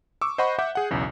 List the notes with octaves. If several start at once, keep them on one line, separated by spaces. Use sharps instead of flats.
C#6 D6 E6
C5 D#5 F#5 B5 C#6
E5 F#5 D6 G6
G#4 F#5
B1 E2 C#3